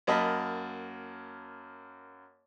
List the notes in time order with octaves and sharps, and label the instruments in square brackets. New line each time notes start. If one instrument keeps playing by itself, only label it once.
[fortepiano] F#2 A#3 D#5 A5 B5